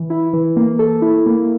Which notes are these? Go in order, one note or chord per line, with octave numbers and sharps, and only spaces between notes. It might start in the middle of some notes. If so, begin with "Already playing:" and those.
Already playing: E3
E4
E3
A#3
A4
E4
A#3